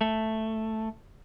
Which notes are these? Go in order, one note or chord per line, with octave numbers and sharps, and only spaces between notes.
A3